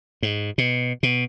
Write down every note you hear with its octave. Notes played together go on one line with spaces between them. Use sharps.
G#2
B2
B2